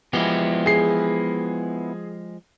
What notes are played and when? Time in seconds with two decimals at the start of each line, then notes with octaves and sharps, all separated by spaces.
0.13 F3 G#3 B3 E4 G4
0.66 G#4 C7